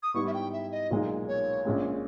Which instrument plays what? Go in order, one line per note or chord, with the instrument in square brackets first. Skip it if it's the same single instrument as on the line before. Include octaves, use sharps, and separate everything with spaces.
[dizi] D#6
[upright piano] G#2 G3 B3 E4 [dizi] C#6
[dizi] E5
G5
E5
D#5
[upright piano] B1 A#2 G#3 D#4
[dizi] C#5
[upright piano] A#1 A#2 G#3 C#4